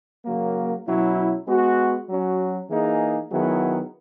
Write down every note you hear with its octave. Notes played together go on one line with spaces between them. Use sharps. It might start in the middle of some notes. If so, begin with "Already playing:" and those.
C#3 F#3 A#3
B2 F#3 C#4 E4
G#3 B3 F#4
F#3 C#4 F#4
E3 A#3 D#4 G#4
D#3 F#3 B3 E4 G#4